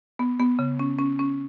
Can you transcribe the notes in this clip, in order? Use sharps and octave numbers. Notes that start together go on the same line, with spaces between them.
B3
B3
C#3
C#4
C#4
C#4